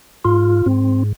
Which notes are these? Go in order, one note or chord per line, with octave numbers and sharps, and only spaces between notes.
G#2 F4
G#2 C4